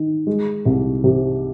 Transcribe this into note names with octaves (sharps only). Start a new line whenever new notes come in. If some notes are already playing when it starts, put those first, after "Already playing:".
Already playing: D#3
G#3
C2
C3